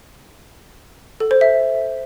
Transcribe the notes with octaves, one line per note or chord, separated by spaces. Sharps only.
A4
C5
E5